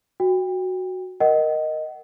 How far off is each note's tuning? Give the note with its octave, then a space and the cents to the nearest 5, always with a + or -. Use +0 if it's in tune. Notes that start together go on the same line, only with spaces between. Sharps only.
F#4 +0 G5 +30
A#4 +0 D#5 +0 F#5 +25